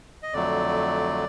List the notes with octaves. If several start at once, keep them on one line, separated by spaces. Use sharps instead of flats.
D#5
F2 D3 F#3 A3 D5